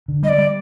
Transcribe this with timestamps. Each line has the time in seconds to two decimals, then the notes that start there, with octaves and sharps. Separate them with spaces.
0.08 D3
0.23 G3 D#5
0.29 D5
0.38 G3